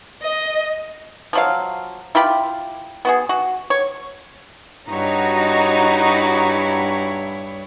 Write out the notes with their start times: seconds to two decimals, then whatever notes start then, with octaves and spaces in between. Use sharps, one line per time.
0.23 D#5
1.33 F3 F#3 F5
2.15 E4 F4 G4 B5
3.05 B3 F#4 G#4
3.29 F#4
3.70 C#5
4.88 G2 D#4 E4 F#4 C#5